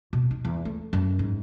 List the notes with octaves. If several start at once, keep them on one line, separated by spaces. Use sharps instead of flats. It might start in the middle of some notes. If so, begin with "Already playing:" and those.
B2
D#4
E2
A3
F#2
G#2